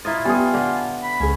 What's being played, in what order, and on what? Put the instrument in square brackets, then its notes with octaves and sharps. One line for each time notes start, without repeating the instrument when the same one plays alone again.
[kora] E4 C#5 D#5 [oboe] F4 [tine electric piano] A#5 D#6 A6
[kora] G3 A4 [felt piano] B3 D#6 [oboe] F4 [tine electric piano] G5 G#5
[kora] D3 D4 D5
[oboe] B5
[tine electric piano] C#2 G#4 [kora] C#4